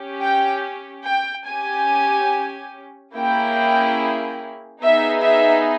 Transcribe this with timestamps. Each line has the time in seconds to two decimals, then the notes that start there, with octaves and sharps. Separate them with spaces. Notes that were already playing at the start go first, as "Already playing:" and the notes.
Already playing: C#4 G4
0.21 G5
1.06 G5
1.47 C#4 G4 G#5
3.15 A#3 C#4 E4 G#4 G5
4.83 B3 D#4 G#4 E5
5.23 E5